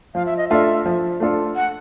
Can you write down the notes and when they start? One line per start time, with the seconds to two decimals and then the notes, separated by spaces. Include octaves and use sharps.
0.15 F3 F5
0.26 E5
0.37 D#5
0.49 A3 D4 F4 A4 E5
0.86 F3
1.20 A3 D4 F4 A4
1.56 F#5